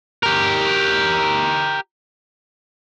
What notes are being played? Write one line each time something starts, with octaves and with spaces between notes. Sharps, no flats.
G4 A#4